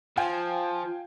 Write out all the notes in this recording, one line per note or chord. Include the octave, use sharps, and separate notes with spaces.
F3 F4 F5 G5 G#5